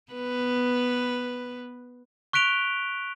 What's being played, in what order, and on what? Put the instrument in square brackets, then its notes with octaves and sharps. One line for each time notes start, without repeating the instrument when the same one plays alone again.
[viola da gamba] B3 B4
[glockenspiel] C#6 F#6 B6 D7 F7 G7